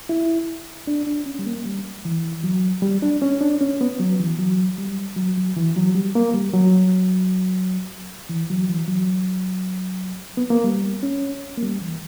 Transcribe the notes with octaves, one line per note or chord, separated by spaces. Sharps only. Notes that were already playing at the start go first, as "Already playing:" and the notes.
E4
D4
D4
C#4
G3
A#3
G3
E3
F#3
G3
D4
C#4
D4
C#4
B3
F#3
E3
F#3
G3
F#3
F#3
E3
F#3
G3
A#3
G3
F#3
E3
F#3
E3
F#3
B3
A#3
G3
C#4
A#3
G3
E3